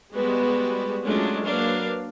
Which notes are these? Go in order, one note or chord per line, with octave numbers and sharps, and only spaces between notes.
G3 G#3 B3 F#4 B4
F#3 G#3 A3 C#4 D4 F4
F#3 A#3 D4 B4 F5